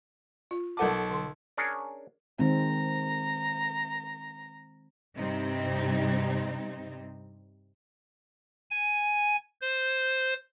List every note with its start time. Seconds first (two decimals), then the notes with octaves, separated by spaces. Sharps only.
0.51 F4
0.77 B1 A4 A#4 F#5 A5 D6
1.10 D3 C6
1.57 C#4 D4 G#4 A#4 C#5
2.39 D#3 G#3 C4 A#5
5.17 G2 C3 G3 C4 D#4
8.71 G#5
9.61 C5